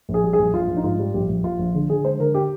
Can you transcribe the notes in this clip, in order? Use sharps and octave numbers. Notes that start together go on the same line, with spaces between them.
A#1
G#4
G3
G#4
A#1
A#1 F4
A#1
D#4
G#2 F4
G3
A#1 G4
A#1
A#1 F4
A#1
D3
D3 G#4
G#3 C5
D3 A#4
G4